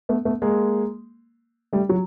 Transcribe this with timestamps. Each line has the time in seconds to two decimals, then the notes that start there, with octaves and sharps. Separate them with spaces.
0.09 A3 B3
0.25 A3 B3
0.42 G#3 A#3
1.73 G3 A3
1.89 F#3